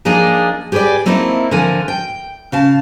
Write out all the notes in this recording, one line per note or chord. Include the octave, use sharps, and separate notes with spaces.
F3 A#3 D4 D#4 F4 G#4
G4 G#4 B4 C5 D5
A3 A#3 C4 D#4 E4
D3 F3 A#4 G#5
G5
C#3 F5 A5